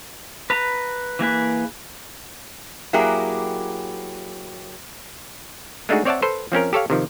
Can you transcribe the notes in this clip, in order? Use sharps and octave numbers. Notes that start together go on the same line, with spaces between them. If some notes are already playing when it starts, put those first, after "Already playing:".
B4 A#5
E3 A#3 G#4 B4
F#3 A#3 E4 G4 G#4
G#3 A3 D4 D#4 F#4 G#4
C4 C#5 D5 E5 F#5 A5
A4 B4 C5
F3 C4 C#4 A#4
G4 A4 C#5 F5
C3 D#3 F3